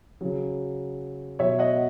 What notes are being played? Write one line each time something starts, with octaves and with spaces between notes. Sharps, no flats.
C#3 F#3
B2 F#3 C#5 E5
D#5 F#5